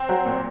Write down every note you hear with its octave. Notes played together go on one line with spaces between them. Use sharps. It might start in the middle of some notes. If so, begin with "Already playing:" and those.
Already playing: C4
F#3
A#2